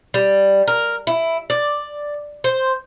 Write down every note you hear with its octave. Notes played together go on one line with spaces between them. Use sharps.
G3
A#4
E4
D5
C5